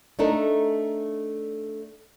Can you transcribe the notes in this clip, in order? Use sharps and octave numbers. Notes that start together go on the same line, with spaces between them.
A3 D4 D#4 A4 A#4